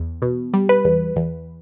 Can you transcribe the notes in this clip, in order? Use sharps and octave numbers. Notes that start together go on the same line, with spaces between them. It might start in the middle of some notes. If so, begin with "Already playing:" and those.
Already playing: E2
B2
G3
B4
E2
E2